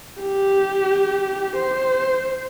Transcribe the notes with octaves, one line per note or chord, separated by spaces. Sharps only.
G4
C5